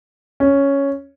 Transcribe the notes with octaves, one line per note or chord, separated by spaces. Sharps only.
C#4